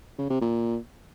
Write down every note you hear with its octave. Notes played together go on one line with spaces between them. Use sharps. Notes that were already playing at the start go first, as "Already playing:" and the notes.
C#3
C3
A#2